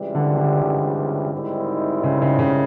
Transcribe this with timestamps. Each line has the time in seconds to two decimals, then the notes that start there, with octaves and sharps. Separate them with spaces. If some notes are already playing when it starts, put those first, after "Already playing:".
Already playing: C#2 C3 E3 G3
0.15 D3
0.37 D3
0.62 D3
1.32 G#2 D#3 G3 C4 E4
2.04 C#3
2.22 C#3
2.39 C#3